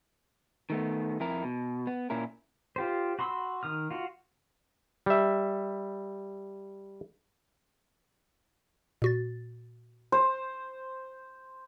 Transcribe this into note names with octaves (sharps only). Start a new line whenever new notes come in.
D#3 A3 B3
F2 E4 A#4
B2
B3
A#2 C#4 E4 A#4
F4 G4 C5
F#4 B5 C6 D#6 E6
D#3 D#6 F6
F4 F#4
G3 E5
A#2 F#4 A6
C5